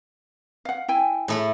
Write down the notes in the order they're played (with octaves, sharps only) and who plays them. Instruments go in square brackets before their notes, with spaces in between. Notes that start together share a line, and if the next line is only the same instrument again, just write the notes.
[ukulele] F5 F#5
E4 G5 G#5
[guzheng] A2 A3 B5 [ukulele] G#4